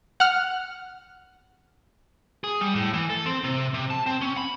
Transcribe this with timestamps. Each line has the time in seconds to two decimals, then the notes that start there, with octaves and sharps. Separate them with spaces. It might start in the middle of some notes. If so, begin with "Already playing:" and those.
0.20 F#5 F6
2.44 G#4
2.61 G3
2.75 A2
2.94 E3
3.10 A4
3.26 C4
3.44 C3
3.74 C3
3.90 A5
4.06 C4
4.21 C#4
4.37 B5